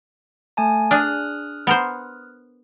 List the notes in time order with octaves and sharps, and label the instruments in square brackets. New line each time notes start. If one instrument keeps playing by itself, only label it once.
[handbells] A3 G#5 A5
[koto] D4 G#4 [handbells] D#6 F6 F#6
[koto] B3 A#4 C5